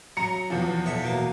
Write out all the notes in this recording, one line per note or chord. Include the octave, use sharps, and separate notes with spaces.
F#3 A#5 C#7
E2 F3
B1 C#5 E5
B2 A#3